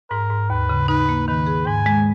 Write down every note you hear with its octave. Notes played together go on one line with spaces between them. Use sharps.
G#2 A#4
G#2
D#2 B4
C#3
D#4 B4
A#3
D#3 B4
G#4
G#2 G#5
G#3